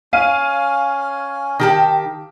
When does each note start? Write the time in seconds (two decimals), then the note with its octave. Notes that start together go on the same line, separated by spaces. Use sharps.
0.13 C#4 F5 G#5 D#7
1.60 D#3 G4 A5